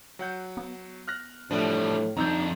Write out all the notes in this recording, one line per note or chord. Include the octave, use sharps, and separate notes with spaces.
F#3 F#5 G6
B3
F6 F#6 A#6
A2 E3 F3 G3 D4
F2 D4 D#4 A#5 E6 G6